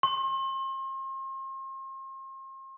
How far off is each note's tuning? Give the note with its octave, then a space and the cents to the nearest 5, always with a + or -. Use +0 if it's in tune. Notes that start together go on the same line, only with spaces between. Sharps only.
C6 +40